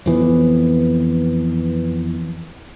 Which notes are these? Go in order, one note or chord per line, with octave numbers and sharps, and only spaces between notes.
F2 E3 B3